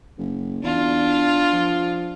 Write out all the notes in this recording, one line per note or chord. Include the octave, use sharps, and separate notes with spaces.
F#1
E2 D4 F4
F3